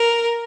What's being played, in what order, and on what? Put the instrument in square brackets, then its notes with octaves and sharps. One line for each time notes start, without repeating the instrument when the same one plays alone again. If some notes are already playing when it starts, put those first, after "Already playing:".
Already playing: [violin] A#4